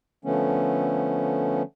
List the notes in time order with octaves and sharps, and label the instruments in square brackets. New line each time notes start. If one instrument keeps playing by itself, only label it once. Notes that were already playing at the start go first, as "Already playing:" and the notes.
[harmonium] D3 F3 A3 B3 C#4